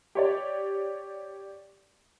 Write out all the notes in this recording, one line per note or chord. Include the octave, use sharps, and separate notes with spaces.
G4 C#5 D5